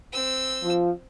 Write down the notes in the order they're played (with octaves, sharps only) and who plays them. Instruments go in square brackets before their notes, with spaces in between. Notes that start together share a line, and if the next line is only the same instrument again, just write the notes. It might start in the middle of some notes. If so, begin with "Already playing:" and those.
[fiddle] C4 E6
[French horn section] F3